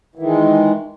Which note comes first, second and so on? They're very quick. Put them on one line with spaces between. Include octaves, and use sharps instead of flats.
E3 D#3 G#3